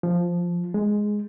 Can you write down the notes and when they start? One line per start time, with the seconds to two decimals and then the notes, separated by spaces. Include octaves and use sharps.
0.03 F3
0.74 G#3